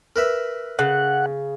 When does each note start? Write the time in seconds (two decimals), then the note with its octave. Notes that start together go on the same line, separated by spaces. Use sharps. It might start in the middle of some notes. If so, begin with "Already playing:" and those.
0.16 A#4 B4 E5
0.79 C#3 F#5